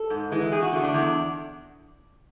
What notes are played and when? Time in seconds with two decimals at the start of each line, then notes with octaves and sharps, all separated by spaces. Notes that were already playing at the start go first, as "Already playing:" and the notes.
Already playing: A4
0.10 G#2
0.32 E3 G#3
0.52 E2 G#4
0.62 F#4
0.73 D3 A3
0.83 D4
0.94 E2